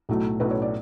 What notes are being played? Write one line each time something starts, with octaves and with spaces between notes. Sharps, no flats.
B1 A2 F#3 A3
B1 A2 F#3 A3 B4
C#5
D5